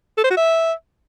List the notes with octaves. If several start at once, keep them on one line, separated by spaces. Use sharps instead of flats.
A4
C5
F#4
E5